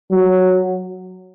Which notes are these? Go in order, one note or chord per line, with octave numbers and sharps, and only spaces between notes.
F#3